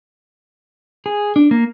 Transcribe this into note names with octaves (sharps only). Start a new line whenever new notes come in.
G#4
D4
A#3